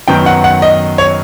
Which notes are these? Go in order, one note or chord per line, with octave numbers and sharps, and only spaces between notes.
F#2 D#3 F#3 B3 G5
F#5
F#5
D#5
C#5